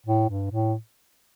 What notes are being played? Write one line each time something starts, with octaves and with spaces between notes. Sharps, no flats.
A2
G2
A2